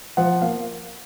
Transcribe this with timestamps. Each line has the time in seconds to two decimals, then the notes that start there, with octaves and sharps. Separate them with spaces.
0.17 F3 F#5
0.42 A#3 F5